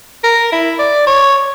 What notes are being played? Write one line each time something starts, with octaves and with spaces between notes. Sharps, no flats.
A#4
E4
D5
C#5